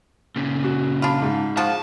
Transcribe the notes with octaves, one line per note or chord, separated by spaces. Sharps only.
A#2 C#3
F#4
D4 F4 B5
G#2
F3 F4 F#4 A5